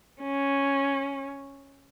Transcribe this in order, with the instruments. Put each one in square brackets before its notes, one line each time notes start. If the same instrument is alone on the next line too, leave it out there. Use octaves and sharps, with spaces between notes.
[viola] C#4